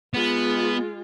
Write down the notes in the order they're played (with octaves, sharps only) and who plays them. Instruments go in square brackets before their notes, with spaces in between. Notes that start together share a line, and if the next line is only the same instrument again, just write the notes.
[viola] G#3 F4 [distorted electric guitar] B3